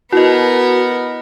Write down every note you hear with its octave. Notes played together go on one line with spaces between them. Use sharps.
B3 E4 F#4 A#4 D#5